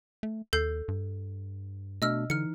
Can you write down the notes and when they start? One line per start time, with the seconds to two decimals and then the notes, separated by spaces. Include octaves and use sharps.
0.23 A3
0.53 D#2 A4 G6 C7
0.88 G2
2.02 B2 A3 D4 D#5 E6 F6
2.30 D3 E3 D#4 F6 C#7